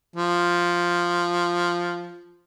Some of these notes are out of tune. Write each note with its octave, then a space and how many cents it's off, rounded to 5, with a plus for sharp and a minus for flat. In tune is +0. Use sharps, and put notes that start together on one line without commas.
F3 +0